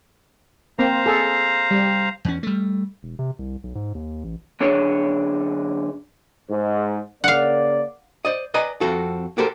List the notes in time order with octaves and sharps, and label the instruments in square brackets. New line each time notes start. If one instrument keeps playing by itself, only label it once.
[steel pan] A#3 C4 [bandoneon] C5 F5 A#5
[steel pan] G#4 A4
G3
[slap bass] E2 C#4
G3 A3
[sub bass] E1
C3
C2
B1
G#2
D#2
A1
[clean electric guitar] F#2 D3 D4 G#4 C#5
[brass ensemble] G#2
[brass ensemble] C#3 A#3 D5 [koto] F5 F#5
[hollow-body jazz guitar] C5 D5 D#5
B4 D5 D#5 G#5 A#5
F2 C4 F#4 A4
F#4 G4 A4 A#4 C5